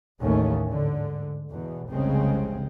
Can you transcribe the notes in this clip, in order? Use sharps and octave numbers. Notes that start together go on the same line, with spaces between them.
A1 D#2 D#3 G#3 A3 C#4
G#2 D3
E2 B2
F1 C2 C#3 G#3 C4